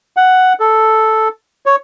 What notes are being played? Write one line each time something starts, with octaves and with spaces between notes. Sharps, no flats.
F#5
A4
C#5